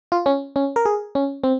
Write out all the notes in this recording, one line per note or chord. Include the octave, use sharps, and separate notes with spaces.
F4
C#4
C#4
A#4
G#4
C#4
C4